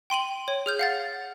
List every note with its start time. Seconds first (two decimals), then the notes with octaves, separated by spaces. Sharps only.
0.10 G5 C6 D#7 F#7
0.48 C#5
0.66 G#4 F6 G6
0.79 F5 F#5 A6